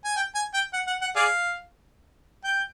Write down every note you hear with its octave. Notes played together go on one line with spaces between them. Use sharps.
G#5
G5
G#5
G5
F#5
F#5
F#5
G#4 D5 F5
G5